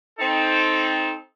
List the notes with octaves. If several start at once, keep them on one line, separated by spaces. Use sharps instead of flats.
C4 D#4 A4